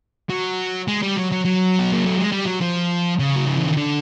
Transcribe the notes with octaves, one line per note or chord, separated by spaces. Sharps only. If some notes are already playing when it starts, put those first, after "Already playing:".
F#3
G#3
G3
F#3
F#3
F#3
B3
A#3
A3
G#3
G3
F#3
F3
C#3
F#3
F3
E3
D#3
D3